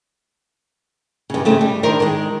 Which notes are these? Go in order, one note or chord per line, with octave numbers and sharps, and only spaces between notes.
G2 C#3
C#3 A3 C4
G3
D#3 D4 A#4 C5
D#3 G#3